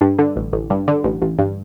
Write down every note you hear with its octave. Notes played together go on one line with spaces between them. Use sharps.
G2
D3
A1
A1
G2
D3
A1
A1
G2